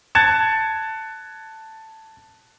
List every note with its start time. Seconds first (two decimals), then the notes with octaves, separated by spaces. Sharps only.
0.15 A5 F#6 G#6 A6 C#7 E7